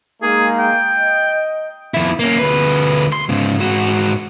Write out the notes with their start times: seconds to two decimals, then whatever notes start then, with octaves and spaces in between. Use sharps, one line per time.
0.22 G#3 A#3 D#4 G#4
0.59 G5
0.98 D#5
1.94 F2 E4
2.19 A#3 C#4
2.39 D2 B4
3.12 C6
3.29 G#2 C#3
3.58 G#2 F#4